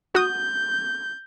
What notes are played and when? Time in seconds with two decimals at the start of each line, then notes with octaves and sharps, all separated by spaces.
0.15 F#4 D#6 G6